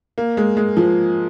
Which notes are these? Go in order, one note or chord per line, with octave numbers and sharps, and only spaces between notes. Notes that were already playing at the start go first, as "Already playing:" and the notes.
A#3
G#3
G#3
F3